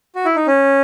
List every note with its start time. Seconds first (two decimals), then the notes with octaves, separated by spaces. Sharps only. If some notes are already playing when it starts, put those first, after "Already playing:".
0.15 F#4
0.25 E4
0.36 D#4
0.47 C#4